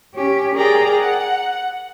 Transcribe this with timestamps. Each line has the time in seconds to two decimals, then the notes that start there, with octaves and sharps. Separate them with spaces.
0.14 C#4 G4
0.55 G#4 A#4 D5 G5 A#5
0.97 F#5